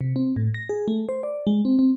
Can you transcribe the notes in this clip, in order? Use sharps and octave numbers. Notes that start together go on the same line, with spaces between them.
C3
C4
A2
A#6
G#4
A3
C5
D5
G#3
C4
C4